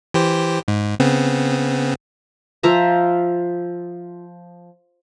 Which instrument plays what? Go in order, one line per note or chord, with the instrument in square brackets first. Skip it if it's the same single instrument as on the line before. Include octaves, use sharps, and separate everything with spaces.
[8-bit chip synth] E3 G4 C5
G#2
C#3 B3 C4
[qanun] F3 F4 E5 A#5